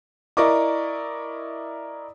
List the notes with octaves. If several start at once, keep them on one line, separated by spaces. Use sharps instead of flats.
E4 A#4 D5 D#5 C#6 D6